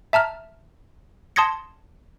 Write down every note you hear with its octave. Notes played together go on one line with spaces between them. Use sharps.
E5 A5 A#5 F6
A5 C6 D#6 G#6 A#6 C#7